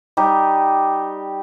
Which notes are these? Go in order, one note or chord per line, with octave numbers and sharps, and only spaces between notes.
G3 D#4 G4